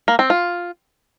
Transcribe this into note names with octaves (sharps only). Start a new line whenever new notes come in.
A#3
C4
F4